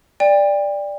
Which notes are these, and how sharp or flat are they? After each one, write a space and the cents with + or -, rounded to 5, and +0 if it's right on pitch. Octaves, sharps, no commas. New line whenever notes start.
D5 +0 G5 +30